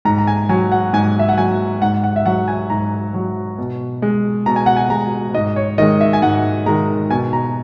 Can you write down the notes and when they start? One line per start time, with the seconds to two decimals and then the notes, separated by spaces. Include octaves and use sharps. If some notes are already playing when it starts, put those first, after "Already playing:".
0.05 G#2 A#5
0.18 A#5
0.27 G#5
0.49 F#3 G#5
0.72 F#5
0.93 G#2 G#5
1.19 E5
1.29 F#5
1.37 F#3 G#5
1.82 G#2 F#5
2.04 F#5
2.16 E5
2.26 F#3 F#5
2.48 G#5
2.70 G#2 A#5
3.14 F#3
3.58 B2
4.02 G#3
4.46 B2 A#5
4.56 G#5
4.66 F#5
4.76 G#5
4.90 G#3 A#5
5.34 G#2 D#5
5.56 C#5
5.78 D#3 G#3 D#5
6.01 E5
6.13 G#5
6.22 G#2 F#5
6.66 D#3 G#3 A#5
7.10 B2 G#5
7.33 A#5